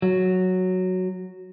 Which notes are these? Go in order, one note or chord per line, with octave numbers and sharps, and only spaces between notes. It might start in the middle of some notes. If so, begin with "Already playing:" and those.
F#3